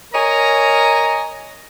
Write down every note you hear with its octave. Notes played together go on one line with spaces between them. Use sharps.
A#4 C#5 D#5 G#5 A#5